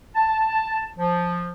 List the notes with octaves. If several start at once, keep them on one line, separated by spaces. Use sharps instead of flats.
A5
F3